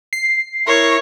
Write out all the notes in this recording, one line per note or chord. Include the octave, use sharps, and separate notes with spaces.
C7
E4 A#4 C#5 C#6 A#6